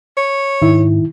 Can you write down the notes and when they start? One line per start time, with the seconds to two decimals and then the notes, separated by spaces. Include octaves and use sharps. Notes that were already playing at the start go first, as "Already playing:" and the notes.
0.17 C#5
0.62 G#2 D#3 E4